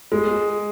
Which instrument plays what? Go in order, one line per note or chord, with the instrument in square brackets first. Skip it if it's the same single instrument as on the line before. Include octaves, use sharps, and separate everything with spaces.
[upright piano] G#3